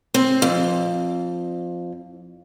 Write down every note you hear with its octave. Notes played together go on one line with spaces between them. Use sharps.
C4
F2